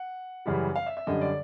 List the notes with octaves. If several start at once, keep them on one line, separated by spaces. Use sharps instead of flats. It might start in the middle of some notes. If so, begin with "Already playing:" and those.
Already playing: F#5
F#2 C#3 E3 G3
F5
E5
E5
F#2 D3 G3 D#5
D5